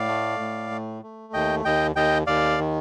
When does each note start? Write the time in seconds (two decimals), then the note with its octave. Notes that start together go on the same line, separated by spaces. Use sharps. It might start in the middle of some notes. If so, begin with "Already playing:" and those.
Already playing: A2 D5 F5
0.08 A3
0.40 A2
0.71 A3
1.03 A3
1.33 D#2 D#5 G5
1.65 D#2 D#5 G5
1.96 D#2 D#5 G5
2.27 D#2 D5 F5
2.59 D#3